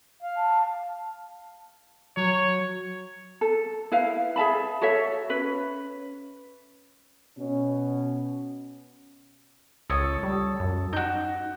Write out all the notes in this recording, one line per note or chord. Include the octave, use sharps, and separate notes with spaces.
F5
A5
F#3 C#5
A4
E4 B4 F5
G#4 E5 A5 B5
F#4 A4 C#5 E5
C#4 B4
B2 C#4
C#2 A4 C#5 D#6
G3
F#2
D#4 F#4 G6